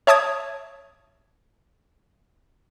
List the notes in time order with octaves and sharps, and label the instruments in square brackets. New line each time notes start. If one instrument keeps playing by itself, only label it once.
[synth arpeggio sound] C#5 E5 A5 D6 D#6 G#6